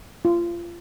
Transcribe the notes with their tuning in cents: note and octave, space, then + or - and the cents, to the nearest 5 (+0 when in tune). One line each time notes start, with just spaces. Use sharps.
F4 -25